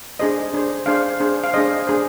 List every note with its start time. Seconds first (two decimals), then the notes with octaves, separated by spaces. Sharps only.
0.19 D4 G#4 C5 D#5
0.53 D4 G#4 C5
0.86 D4 G#4 C5 F5
1.20 D4 G#4 C5
1.44 F5
1.54 D4 G#4 C5 D#5
1.87 D4 G#4 C5